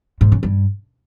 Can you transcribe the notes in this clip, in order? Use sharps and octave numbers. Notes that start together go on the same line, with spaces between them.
G#2
C#3
G2